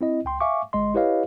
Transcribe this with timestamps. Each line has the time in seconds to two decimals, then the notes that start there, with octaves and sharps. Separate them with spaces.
0.01 C4 E4 D#5
0.25 C#2 G5 C6
0.40 E5 F5 G#5 C#6 D6
0.73 G1 G#3 D#5 C6
0.94 E4 G4 B4 C#5 D#5 F5